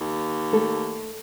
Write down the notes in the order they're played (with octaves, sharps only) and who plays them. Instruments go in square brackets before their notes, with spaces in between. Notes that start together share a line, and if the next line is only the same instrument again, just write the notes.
[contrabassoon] D#2
[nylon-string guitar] A3 A4